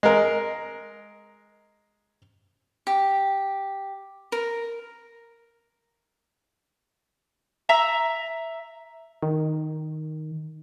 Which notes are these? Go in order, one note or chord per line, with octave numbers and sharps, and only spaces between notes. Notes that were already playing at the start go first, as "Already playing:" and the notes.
G#3 A#4
G4
A#4
E5 A#5 E6
D#3